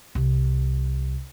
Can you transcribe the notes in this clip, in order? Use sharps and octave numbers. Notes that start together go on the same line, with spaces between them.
C2